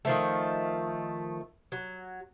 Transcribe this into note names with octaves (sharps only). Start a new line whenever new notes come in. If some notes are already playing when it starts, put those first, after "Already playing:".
D#3 F3 A3
F#3